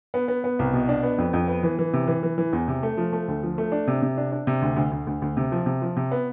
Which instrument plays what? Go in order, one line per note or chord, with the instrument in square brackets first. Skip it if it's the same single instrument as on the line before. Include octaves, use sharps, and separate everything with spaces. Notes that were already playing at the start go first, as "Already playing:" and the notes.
[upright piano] B3
B3
B3
C2
B2
D4
B3
F2
F2
B3
E3
E3
C3
E3
E3
E3
E2
C3
A3
F3
A3
D2
F3
A3
D4
C3
C3
D4
D4
C3
D2
D2
D2
D2
D2
C3
F3
C3
F3
C3
B3